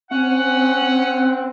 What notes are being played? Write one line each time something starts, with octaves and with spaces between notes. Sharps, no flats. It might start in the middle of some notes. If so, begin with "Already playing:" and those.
C4 C#4 F#5
C4